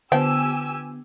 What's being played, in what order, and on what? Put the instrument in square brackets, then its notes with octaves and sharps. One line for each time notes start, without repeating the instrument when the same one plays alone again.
[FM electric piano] D3 B3 [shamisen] F3 G5 [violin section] G4 G#5 E6